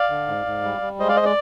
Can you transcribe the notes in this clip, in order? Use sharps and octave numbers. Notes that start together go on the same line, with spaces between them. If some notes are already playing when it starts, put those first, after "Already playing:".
Already playing: D5 F5
D3
G#2
G#2
G3
G3
G#3 C5 D#5
D5 F5
C5 D#5
D5